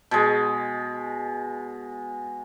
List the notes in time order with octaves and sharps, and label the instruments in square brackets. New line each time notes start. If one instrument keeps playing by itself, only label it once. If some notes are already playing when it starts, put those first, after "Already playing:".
[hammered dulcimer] B2 G#3